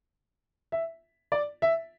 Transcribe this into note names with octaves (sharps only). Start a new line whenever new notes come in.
E5
D5
E5